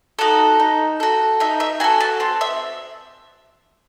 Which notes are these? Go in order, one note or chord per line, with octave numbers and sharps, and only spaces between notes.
D#4 F#4 A4
D#4
F#4 A4
D#4 E5
E5
F#4 A4 G#5
A5
C4 C6
E5